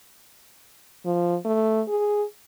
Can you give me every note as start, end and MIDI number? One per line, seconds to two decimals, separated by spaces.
1.05 1.36 53
1.45 1.82 57
1.88 2.23 68